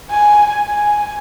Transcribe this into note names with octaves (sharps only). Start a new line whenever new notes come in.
G#5
G#5